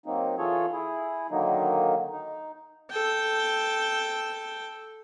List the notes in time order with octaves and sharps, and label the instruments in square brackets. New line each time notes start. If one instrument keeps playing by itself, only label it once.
[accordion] F#3 A#3 C4 D#4
E3 F4 G#4 A4 C#5
E4 G#4
D3 D#3 F#3 A#3 D#4
D#4
[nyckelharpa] A4 G5